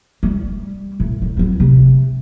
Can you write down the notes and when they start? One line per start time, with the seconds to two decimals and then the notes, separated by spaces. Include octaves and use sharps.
0.23 G3
1.00 A2
1.22 D#3
1.37 F#3 C4
1.60 C3